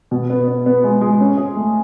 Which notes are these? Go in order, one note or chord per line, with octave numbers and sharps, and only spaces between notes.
B2
B3
B3
B3
G#3
G#3
C#4
G#4
A3